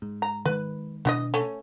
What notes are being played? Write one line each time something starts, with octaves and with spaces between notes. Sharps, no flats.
G#2
A#5
D#3 G#3 B4
B2 E3 D4 F#4 D#5
A3 C#4